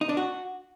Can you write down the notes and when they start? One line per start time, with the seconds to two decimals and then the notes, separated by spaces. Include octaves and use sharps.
0.01 D#4
0.09 D4
0.17 F#4